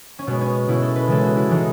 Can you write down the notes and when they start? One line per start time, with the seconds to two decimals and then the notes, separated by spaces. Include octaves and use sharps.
0.19 C#4
0.27 B2 G#3 B3
0.41 C#4
0.68 B2 G#3 E4
0.82 A4
0.96 B4
1.08 C#3 E3 G#3 A4
1.23 F#4
1.37 E4
1.49 C#3 E3 G#3 D#4